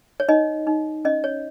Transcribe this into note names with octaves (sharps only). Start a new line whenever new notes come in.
C#5
D#4 D#5
D#4
C#4 D#5
C#5